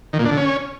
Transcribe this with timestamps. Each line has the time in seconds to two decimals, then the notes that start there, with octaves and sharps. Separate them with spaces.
0.13 D#3
0.19 A#2
0.25 D4
0.31 D3
0.37 C#4